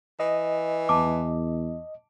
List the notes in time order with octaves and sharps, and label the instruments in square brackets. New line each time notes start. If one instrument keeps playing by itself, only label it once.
[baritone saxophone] E3 [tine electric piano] D#5
[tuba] E2 [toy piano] A5 D6